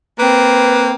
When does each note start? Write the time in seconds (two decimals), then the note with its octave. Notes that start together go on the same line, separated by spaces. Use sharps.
0.19 A#3 C4 B4